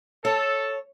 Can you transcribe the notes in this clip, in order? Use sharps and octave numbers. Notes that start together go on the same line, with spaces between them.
A4 C#5